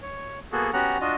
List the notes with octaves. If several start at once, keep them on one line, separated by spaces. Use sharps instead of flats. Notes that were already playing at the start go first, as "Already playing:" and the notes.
C#5
A#3 B3 F#4 G#4 A4
B3 C#4 F#4 G4 F#5 A#5
D4 F4 F#4 D#5